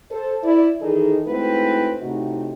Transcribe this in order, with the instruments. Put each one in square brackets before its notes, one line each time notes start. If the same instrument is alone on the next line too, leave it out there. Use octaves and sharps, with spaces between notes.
[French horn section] A4 C5
E4 D5
D#3 E3 D#4 G#4 A4
G#2 A3 C4 E4 F#4 B4
A2 C3 D#4 F#4